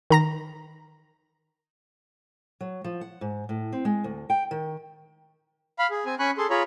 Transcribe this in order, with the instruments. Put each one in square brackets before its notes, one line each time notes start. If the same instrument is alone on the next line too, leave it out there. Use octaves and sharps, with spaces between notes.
[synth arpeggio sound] D#3 A#5 A#6
[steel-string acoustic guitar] F#3
F3
F#5
G#2
A2
C4
G#3
D2
G5
D#3
[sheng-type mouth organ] F5 B5
G#4
C4 G#5
C#4 G#5 B5 C#6 F#6
G#4 A4 C6
F4 G#4 C#5 A#5 B5